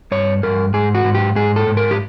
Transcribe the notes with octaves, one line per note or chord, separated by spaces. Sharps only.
G2 C#5
G2 A#4
G#2 G#4
F#4
G#2
G4
G#2 G#4
A4
G#2
A#4
G4